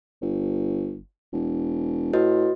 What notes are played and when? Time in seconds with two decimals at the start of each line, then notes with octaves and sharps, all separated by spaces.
0.22 G1
1.33 E1
2.13 A2 F#4 B4 D#5